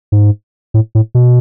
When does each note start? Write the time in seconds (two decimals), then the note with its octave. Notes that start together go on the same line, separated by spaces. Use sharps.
0.12 G#2
0.74 A2
0.95 A2
1.15 B2